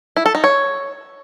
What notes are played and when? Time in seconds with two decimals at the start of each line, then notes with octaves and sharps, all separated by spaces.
0.17 E4
0.26 A4
0.35 D#4
0.44 C#5